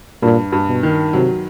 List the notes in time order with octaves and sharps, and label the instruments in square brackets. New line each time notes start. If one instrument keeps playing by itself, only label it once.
[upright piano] G2 [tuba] A#2
[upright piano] G2
[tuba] B2
[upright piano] D#3
[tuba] C3 [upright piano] F#3